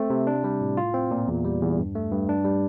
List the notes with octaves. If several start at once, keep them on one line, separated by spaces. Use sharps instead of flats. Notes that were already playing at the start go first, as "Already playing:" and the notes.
Already playing: A3 C4
C3
D4
G3
A2
F4
C4
A#2
E2
G3
E2
G2
A3
G2
D4
G3